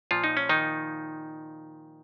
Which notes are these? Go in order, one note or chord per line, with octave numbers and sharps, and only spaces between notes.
A#2 F3 F4
D#4
C#4
D#3 D#4